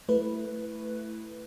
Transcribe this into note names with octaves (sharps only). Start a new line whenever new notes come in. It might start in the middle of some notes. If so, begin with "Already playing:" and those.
A3 E4 B4